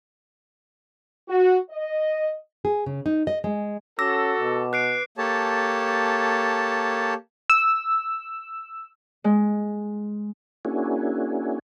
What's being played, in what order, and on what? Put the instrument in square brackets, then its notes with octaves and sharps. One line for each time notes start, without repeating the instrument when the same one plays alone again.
[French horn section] F#4
D#5
[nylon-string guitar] G#4
C#3
D#4
D#5
G#3
[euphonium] C#4 [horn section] F#4 A4 [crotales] D6 [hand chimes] E6 A#6
[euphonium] B2
[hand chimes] B4 [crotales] F#6 C7 D7
[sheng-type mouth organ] A#3 G4 A4 C#5 A5
[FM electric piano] E6
[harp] G#3
[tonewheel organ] A#3 C#4 D4 E4 F#4 G#4